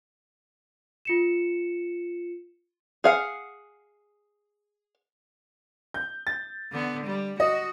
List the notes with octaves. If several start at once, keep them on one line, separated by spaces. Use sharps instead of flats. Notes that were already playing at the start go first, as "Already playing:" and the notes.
F4 C#7 E7
G#4 F5 F#5
G6
A6
D3 B3
G3
F#4 D#5